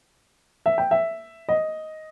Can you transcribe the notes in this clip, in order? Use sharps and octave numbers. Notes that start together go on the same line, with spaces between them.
E5
G5
E5
D#5